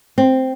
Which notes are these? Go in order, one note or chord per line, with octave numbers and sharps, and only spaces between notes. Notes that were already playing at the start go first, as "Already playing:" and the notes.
C4